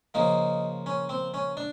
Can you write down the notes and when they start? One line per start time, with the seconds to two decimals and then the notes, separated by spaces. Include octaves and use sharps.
0.14 C#3 F3 A#3 D#4
0.86 C#4
1.09 C4
1.34 C#4
1.57 D4